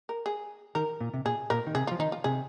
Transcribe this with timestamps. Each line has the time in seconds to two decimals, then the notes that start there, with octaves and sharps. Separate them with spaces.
0.09 A#4
0.26 G#4
0.75 D#3 A#4
1.00 A#2
1.14 C3
1.25 A#2 G#4
1.50 A#2 A#4
1.67 D#3
1.75 C3 G#4
1.87 F3 F4
1.99 D#3 D#4
2.12 F4
2.24 C3 G#4